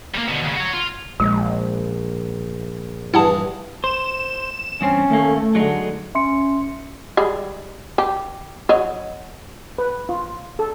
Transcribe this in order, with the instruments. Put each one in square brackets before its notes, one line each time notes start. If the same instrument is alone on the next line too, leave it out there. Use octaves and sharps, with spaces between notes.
[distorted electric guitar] G3 A#3
B2 D3
D#2 C#3
F#4 C#5
F4
[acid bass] A#1 [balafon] G#3
[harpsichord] G2 E3 G#4 [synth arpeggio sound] E4 F#5 A5
[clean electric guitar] C5 [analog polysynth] E7
[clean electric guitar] E2 G2 C4 [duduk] C#4
[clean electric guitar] D#2 A#3 [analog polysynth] A3
[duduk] D3 [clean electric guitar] F#3 G#3 D#4
[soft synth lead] C#4 [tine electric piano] E5 C6 C#7
[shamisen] G3 G#3
G4
F#3 D#5
[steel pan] B4
F4
A4